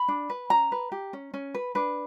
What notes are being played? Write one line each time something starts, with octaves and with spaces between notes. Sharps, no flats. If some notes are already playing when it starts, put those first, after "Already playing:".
Already playing: B5
D4
B4
C#4 A#5
B4
G4
C#4
C#4
B4
D4 B4